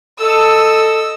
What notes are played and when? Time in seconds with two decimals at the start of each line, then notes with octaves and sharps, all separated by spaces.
0.19 A4 D#5 E6